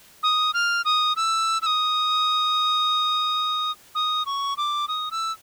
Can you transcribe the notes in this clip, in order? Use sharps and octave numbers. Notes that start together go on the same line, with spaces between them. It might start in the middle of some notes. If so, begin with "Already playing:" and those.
D#6
F6
D#6
E6
E6
D#6
D#6
C#6
D6
D#6
E6